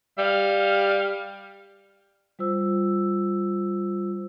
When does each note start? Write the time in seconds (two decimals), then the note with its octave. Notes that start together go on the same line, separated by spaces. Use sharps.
0.18 G3 F5
2.39 G3 F4 C5 E6